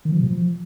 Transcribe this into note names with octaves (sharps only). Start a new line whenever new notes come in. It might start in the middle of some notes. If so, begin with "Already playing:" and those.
D#3
F3
B2
F3